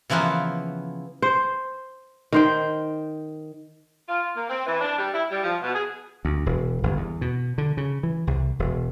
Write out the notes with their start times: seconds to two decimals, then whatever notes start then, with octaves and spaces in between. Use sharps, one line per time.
0.10 C#3 E3 F3 A#3 B3
1.22 C5
2.32 D#3 C5 G5
4.09 F4
4.35 A#3
4.49 C4
4.66 E3
4.81 D4
4.98 G3
5.13 E4
5.31 G3
5.44 F3
5.63 B2
5.74 G#4
6.25 D2
6.46 E1
6.83 G1
6.97 E2
7.21 B2
7.58 D3
7.77 C#3
8.03 E3
8.27 C2
8.59 E1